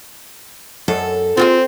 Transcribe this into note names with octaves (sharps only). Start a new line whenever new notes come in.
F#2 A4
C4 F4 F#4 G#4